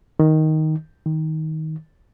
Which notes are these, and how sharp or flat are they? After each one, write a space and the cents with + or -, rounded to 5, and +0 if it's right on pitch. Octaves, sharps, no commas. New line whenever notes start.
D#3 +5
D#3 +15